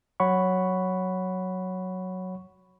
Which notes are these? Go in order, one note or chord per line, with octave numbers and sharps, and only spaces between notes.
F#3 C#5 F#5 B5 C#6